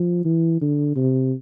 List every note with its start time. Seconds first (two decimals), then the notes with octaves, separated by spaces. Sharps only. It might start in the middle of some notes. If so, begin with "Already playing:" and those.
Already playing: F3
0.25 E3
0.61 D3
0.96 C3